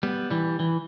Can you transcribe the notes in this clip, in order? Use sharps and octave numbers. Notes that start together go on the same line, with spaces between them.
G3 B3
E3 G3
E3